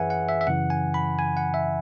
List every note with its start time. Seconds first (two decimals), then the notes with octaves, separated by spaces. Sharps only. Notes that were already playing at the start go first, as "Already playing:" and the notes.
Already playing: F#2 E3 G#4 B4 C#5 E5 F#5 G#5
0.10 F#5
0.29 E5
0.41 E5
0.47 F#2 C#3 E3 F#5
0.70 G#5
0.94 B5
1.19 G#5
1.37 F#5
1.54 E5